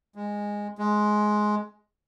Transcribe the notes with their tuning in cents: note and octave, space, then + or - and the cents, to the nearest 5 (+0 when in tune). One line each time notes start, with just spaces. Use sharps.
G#3 -10
G#3 +15